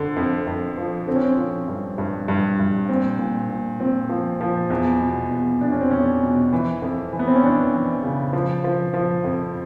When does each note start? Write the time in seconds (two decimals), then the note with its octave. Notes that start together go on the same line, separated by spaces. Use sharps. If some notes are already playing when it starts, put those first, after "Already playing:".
Already playing: F2 D3
0.16 F2
0.47 F2
0.77 F3
1.07 D3 C4
1.15 C#4
1.23 C4
1.38 F3
1.68 G2
1.98 G2
2.28 G2
2.59 G2
2.89 A#2 C4
3.19 A#2
3.50 A#2
3.80 A#2 C4
4.09 F3
4.41 F3
4.70 E2
5.01 B2
5.30 E2
5.61 E2 D4
5.72 C#4
5.81 C4
5.91 E2 C#4
6.22 B2
6.52 E3
6.82 F2
7.13 E3
7.19 B3
7.28 C4
7.36 C#4
7.43 E3 D4
7.73 E3
8.03 C#3
8.33 F3
8.64 F3
8.94 F3
9.24 F2